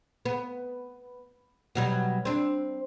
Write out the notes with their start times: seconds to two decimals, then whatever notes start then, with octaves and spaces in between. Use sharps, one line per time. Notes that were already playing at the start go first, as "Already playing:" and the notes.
0.25 B3
1.75 B2 F#3 G3
2.25 C4 D4